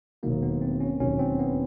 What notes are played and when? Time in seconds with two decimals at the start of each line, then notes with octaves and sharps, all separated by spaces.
0.23 E1 D#2 D#3 F#3 A#3
0.42 B3
0.61 C4
0.80 C#4
1.00 E1 D#2 D#3 F#3 C#4
1.19 C4
1.39 B3